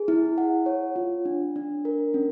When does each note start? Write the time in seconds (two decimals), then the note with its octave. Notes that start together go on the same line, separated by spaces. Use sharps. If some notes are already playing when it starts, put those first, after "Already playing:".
Already playing: G#4
0.08 E4
0.38 F#5
0.66 C#5
0.96 F4
1.25 D4
1.56 D4
1.85 A#4
2.14 C#4